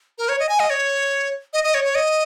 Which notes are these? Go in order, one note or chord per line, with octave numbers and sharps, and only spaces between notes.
A#4
C#5
D#5
G#5
D#5
C#5
D#5
D#5
C#5
C#5
D#5